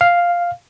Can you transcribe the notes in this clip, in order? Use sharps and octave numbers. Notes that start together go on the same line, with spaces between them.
F5